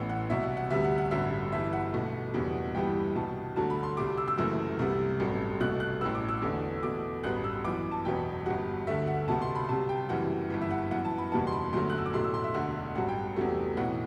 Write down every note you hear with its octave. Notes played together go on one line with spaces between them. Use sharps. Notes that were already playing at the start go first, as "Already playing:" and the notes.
Already playing: A1 A2 E3 B3 E6
F#5
C2 B2 F#3 E5
F#5
F#5
D2 C3 G3 B3 E5
F#5
F#5
A1 G2 D3 F#3 E5
G1 G2 E3 E5
F#5
B1 B2 A3
F#1 E2 B2 G3
G1 G2 E3 G3 B3 G5
C2 B2 G3 A5
D2 D3 F#3 A3 A5
B5
C6
C2 C3 G3 D6
E6
E6
F#1 F#2 E3 A3 E6
C2 C3 G3 B3
A1 G2 F#3 A3
C2 B2 A3 F#6
F#6
A1 A2 F#3 B3 E6
D6
E6
E2 D3 A3
E2 B2 A3 D6
A1 G2 F#3 B3 F#6
E6
F#2 E3 B3 D6
A5
E1 E2 B2 F#3 B3 G5
G1 G2 F#3 F#5
D2 D3 A3 E5
F#5
C2 B2 G3 B3 A5
C6
B5
C2 C3 F#3 A5
G5
F#1 F#2 E3 G3 F#5
G1 G2 E3
E5
F#5
F#2 E3 B3 F#5
A5
B5
F#1 E2 B2 G3 B3 A5
C6
B5
G1 F#2 D3 F#3 A3 C6
F#6
E6
D6
B1 A2 F#3 A3 C6
E6
C6
E5
E1 D2 D3 F#5
A1 G2 F#3 F#5
G5
E2 C3 F#3 A3
B1 A2 E3 F#5